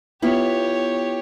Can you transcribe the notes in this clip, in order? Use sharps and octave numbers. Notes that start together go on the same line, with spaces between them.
B3 E4 F4 G4 C#5